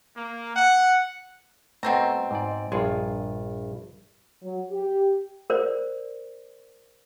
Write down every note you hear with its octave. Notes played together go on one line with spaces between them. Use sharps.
A#3
F#5
B2 A3 C4 A#5
G#2 D5
A#1 G2 G#3 F4
F#3
G4
A#4 C5 D5